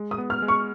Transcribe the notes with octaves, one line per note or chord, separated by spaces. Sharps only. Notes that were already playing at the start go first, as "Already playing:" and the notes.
Already playing: G#3
D#6
B3
F6
G#3
C#6